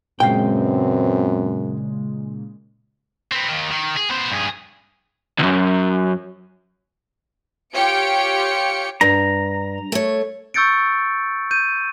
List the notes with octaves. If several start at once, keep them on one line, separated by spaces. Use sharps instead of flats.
F#2 A#2 C#3 G#3 B3 C4 F5 G5
B3 C4
D#2 D#3
D#3
G#4
B3 C5
G2 G#4
C#2 F#2
F4 G4 C#5 G5 C#7 D7
G2 A#5
A3 C#5
C#6 E6 G6 A6 C#7 D7
G6 D#7